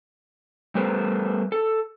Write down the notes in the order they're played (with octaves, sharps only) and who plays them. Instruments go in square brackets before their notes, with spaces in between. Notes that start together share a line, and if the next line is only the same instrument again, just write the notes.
[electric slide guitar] G3 A3 B3 A#4 C5
A4